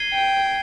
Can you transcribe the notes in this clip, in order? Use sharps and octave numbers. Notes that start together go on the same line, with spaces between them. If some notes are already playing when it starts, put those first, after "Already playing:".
Already playing: G#6 C7 D#7 G7
G5